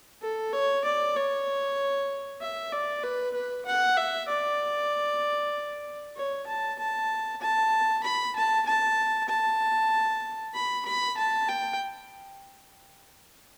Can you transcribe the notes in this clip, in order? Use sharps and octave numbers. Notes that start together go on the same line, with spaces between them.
A4
C#5
D5
C#5
E5
D5
B4
B4
F#5
E5
D5
C#5
A5
A5
A5
B5
A5
A5
A5
B5
B5
A5
G5